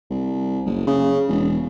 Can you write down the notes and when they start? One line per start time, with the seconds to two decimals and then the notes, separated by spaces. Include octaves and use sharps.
0.10 C2
0.65 F#1
0.87 C#3
1.28 E1